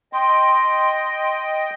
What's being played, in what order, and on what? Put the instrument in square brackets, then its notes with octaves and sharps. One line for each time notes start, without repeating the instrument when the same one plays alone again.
[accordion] D#5 G5 [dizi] C6